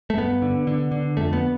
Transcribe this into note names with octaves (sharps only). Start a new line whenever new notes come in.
A3
G2 B3
D3
D3
D3
F2 A3
B3